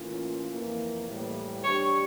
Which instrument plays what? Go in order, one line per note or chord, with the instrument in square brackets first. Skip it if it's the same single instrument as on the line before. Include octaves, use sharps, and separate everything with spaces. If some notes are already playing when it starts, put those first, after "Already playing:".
Already playing: [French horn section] A2 E3 A#3 C#4 F4
F2 E3 A#3
A2 E3 G3
[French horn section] G3 D4 G4 [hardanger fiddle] C#5